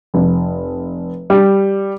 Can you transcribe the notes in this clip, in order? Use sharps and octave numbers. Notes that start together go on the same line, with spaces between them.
F1
G3